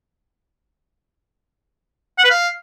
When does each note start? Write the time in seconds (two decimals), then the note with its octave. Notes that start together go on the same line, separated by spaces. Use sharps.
2.18 F#5
2.24 B4
2.30 F5